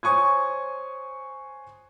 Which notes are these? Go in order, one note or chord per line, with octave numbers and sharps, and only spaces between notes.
C5 C#5 G#5 C#6 D#6 G#6